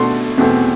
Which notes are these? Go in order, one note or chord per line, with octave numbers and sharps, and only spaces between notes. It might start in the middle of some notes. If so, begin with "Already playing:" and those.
Already playing: B2 A3 D4 F#5 C6
E2 B2 A3 C4